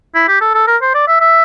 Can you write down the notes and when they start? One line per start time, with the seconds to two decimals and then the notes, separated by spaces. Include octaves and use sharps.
0.15 E4
0.28 G4
0.41 A4
0.55 A4
0.67 A#4
0.82 C5
0.95 D5
1.08 E5
1.21 E5